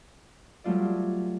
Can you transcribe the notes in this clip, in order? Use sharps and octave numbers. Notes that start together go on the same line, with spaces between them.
F#3 G3 A3 F4 D5